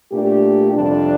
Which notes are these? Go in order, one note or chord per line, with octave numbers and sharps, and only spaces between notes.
A#2 A3 D4 G4
F2 C3 G3 D4